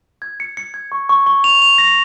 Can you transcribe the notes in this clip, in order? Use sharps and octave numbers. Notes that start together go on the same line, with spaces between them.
G#6
C#7
C#7
G#6
C#6
C#6
C#6
F7
F7
A#6